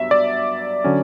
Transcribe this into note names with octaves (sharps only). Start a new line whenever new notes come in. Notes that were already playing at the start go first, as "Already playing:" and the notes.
Already playing: G2 F#3 B3 E5
D5
D3 F#3 C#4